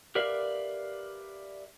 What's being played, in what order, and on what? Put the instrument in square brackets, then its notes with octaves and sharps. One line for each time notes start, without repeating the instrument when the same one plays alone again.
[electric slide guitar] G4 A#4 B4 D5 E5 F5